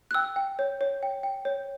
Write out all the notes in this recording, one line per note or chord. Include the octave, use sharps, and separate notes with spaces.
F#6
G5 E6
G5
C#5
C#5
G5
G5
C#5